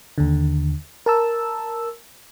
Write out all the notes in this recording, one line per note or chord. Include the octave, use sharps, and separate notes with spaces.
D#2 D3
A#4 A5 E6